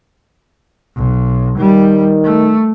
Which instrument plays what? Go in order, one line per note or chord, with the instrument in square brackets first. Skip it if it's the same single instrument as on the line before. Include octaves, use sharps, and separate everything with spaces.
[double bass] B1
[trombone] D#3 [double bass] G3
[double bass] A3